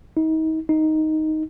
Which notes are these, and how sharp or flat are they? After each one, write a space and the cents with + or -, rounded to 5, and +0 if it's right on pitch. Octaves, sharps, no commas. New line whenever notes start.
D#4 +35
D#4 +5